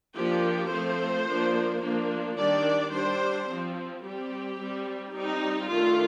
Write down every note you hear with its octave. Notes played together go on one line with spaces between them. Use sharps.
F3 A#3 D4 G4
F3 A3 C4 C5
F3 A#3 D4
F3 A#3 D4
D#3 G3 D4 D5
G3 D4 C5
F3 C4
G3 C4 G4
G3 C4
G3 C4 D#4
D#3 A3 D4 F4